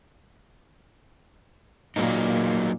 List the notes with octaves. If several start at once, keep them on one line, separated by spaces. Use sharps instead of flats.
A#2 F#3 A#3 D#4